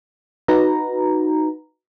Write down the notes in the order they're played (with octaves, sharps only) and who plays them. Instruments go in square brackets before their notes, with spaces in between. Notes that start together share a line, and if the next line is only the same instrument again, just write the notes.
[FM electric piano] D#4 F#4 B4 A#5